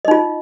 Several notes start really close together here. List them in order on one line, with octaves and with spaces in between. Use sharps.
D#5 D#4 F4